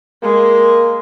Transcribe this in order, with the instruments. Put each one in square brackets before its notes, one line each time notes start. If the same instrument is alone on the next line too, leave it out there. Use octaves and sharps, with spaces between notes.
[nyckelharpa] G#3 [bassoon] A#3